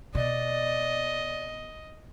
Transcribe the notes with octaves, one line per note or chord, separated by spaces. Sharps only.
B2 D5 D#5